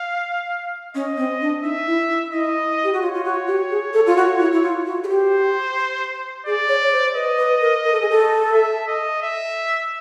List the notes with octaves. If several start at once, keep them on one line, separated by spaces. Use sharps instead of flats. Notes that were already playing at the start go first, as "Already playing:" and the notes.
Already playing: F5
C#4 D#5
C4
D4
D#4 E5
E4
E4
E4 D#5
G4
F#4
F4 C#5
F4
F#4
G4
G#4
A4
F4
F#4
E4
E4
F4
F#4
G#4
G4 C5
G#4 D5
C#5
C#5
C5
B4 D#5
B4
A#4
A#4
A4
G#4
A4
E5
D#5
E5